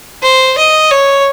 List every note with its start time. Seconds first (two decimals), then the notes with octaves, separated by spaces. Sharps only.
0.23 C5
0.57 D#5
0.91 C#5